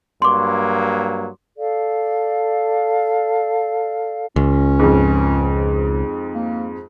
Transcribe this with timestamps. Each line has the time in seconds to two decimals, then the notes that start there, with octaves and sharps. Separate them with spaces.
0.22 G2 F#3 A#3 C6 D6
1.58 A4 D5 F5
4.36 C#2 C#4
4.79 F2 G#2
6.35 A#3